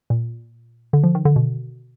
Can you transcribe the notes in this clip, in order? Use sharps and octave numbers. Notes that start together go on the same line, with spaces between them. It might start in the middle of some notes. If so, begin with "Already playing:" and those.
A#2
D3
F3
D#3
D3
B2